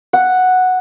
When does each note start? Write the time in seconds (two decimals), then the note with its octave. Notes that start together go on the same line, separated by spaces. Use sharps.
0.13 F#5